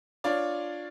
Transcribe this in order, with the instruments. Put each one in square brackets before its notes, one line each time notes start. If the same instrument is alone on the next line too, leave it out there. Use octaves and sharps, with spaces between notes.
[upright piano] D4 F4 C#5 D5